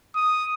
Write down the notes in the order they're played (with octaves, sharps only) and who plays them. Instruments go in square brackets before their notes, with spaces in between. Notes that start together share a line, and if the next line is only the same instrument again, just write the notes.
[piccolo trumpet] D#6